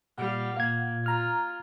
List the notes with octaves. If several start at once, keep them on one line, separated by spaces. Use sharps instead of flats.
A#2 G3 F5 F#5
A#3 F5 G#6
F4 A#5 F6